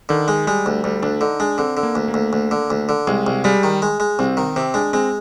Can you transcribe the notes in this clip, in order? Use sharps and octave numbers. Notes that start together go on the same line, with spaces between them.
D3 D#3
G#3
G3 G#3
D2
D2 G3
D2 D4
D3 D#4
G#3 D4
D3 C4
D3
A#3
D2
A#3
D2
D2
D3
D2
D3
C2 G#3
C2
G3 G#3
D#3
G#3
G#3
C2 C4
D#3
C3 C4
G#3 D4
G#3 C4